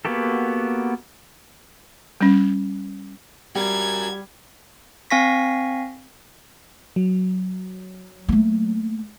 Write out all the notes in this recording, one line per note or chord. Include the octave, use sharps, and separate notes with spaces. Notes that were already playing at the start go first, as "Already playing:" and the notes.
A#3 B3 F#4 G4 A4
G3 C#4
G3 F#4 A#4 G#6
C4 F5 G#5 C#6 A#6 B6
F#3
A3 A#3